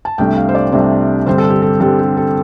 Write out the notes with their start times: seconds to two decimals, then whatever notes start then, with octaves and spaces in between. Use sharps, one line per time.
0.05 A5
0.18 C2 C3 A3 D4 G5
0.37 F5
0.49 C5
0.55 D5
0.72 C2 C3 A3 D4 C5
1.26 G2 D3 G3 C4 C5
1.38 A4
1.50 G4
1.62 A4
1.80 G2 D3 G3 C4 A4
1.99 G4
2.17 A4